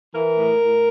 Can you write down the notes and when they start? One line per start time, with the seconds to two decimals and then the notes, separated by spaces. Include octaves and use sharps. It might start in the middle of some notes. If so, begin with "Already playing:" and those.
0.13 E3 A#4
0.38 A2
0.62 A2